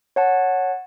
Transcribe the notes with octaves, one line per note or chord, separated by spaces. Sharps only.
C#5 F#5 A5